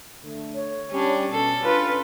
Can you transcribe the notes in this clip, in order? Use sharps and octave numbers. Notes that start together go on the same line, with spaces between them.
D3 A3
C#5
G3 C#4 D4
B2 C#4 A4
D4 F4 B4